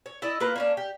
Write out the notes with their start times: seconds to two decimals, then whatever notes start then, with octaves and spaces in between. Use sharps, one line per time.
0.06 C#5
0.22 E4 D5 D#5
0.40 A#3 F4 A#4 B4
0.56 A#3 C#4 D4
0.77 G4